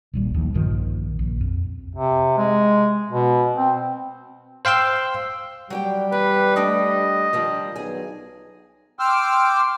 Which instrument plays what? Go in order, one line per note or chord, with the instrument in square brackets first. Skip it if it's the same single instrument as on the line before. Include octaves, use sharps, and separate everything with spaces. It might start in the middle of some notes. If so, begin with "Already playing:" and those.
[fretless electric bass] D#1 A#1 G3
D#2 F3
A#1 G2 D#3 F3
A#1
F2
[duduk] C3
G#3
B2
C4
[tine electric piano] C5 F5 G5 C6 E6
[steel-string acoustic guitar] F#3 G4 G5 [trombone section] G3
[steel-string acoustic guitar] E2 [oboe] B4
[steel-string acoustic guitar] A3 D4 G4 [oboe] D#5
[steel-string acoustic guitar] D#3 F3 G3
[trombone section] B1 [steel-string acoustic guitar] G#4 G#5
[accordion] G5 C6 D6 E6 F6